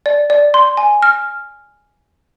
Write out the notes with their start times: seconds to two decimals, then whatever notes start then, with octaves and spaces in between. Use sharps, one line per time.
0.06 D5
0.30 D5
0.54 C6
0.77 G#5
1.02 F6